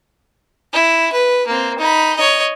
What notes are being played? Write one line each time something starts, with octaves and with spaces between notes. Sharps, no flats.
E4
B4
A#3 C4
D#4 B5
C#5 D#5